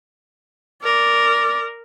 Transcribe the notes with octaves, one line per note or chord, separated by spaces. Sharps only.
A#4 D5